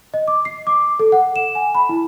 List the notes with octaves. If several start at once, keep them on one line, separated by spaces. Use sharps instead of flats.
D#5
D6
C7
D6
A4
F#5
E7
G#5
B5
E4